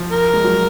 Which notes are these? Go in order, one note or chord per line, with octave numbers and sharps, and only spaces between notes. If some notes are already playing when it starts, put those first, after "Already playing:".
Already playing: F3
A#4
G#3
F#3